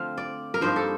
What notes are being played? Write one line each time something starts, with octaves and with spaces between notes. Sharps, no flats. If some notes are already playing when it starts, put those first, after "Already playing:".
Already playing: D3 F3 A3 C4 F5
D5
A#4
G2 F3 A#3 D#4 C5
A4